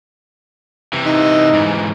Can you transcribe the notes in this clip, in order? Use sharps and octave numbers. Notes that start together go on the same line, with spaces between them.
C3 E3
D#4
G#2 E3